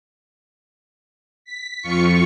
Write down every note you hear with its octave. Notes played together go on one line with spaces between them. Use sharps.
B6
F2 F4 C#6 C#7